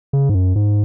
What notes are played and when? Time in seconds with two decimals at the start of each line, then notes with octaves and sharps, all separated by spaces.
0.13 C#3
0.29 G#2
0.34 F#2
0.56 G#2